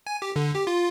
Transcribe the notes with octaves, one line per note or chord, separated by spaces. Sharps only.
G#5
G4
D3
G4
F4